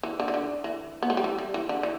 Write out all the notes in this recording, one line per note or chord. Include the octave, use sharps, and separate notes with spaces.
E3
D3
E3
D3
E3
B3
A3
G3
E3
G3
E3
D3
E3